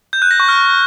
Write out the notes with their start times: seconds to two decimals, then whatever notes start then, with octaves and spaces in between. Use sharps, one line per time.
0.13 G6
0.22 F#6
0.31 A#6
0.40 C#6
0.48 F6